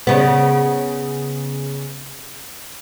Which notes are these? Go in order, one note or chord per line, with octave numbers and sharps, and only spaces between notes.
C#3 B3